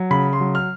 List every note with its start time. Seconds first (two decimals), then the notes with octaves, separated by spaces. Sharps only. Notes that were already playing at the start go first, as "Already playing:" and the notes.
Already playing: F#3
0.10 C#3 B5
0.33 C6
0.40 F#3
0.55 F6